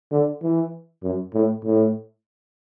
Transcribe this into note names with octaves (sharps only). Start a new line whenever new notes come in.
D3
E3
F#2
A2
A2